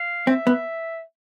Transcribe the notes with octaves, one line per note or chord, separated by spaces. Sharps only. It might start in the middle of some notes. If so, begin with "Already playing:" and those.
Already playing: F5
C4 E5
B3